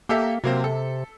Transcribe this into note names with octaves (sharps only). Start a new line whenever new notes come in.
A#3 G4 A4 E5
C3 F#3 A#3 C4
A4